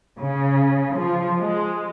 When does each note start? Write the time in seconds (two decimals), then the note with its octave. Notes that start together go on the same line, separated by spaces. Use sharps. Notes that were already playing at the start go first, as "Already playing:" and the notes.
0.19 C#3
0.98 F3
1.41 G#3